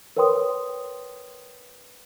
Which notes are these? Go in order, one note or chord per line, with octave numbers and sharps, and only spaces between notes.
A#4 B4 C#5 G5 C6 D#6